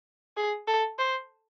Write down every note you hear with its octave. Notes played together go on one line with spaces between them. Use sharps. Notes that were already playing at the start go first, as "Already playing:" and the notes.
G#4
A4
C5